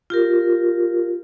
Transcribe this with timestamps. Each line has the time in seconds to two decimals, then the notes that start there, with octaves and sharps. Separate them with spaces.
0.10 F4 G4 A#4